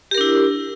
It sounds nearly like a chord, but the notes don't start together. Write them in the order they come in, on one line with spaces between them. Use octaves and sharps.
G4 A#4 D4 E4